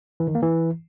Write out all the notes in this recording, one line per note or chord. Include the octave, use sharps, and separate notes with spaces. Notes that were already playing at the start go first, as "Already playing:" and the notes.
E3
D#3
A#3
E3